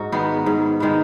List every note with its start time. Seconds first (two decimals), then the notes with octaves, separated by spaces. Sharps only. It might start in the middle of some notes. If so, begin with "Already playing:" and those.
Already playing: G#2 D#4 F#4
0.12 D#3 G#3 B3
0.46 G#2
0.80 D#3 G#3 B3